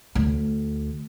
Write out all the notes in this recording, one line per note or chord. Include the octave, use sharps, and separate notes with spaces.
D2